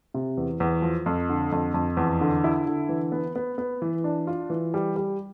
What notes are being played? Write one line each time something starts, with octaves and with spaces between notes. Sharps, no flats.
C3
E2
E2
F3
F2
D3
F2
F2
E2
D3
E4
D3
E3
B3
B3
B3
E3
D4
F4
E3
G3
G3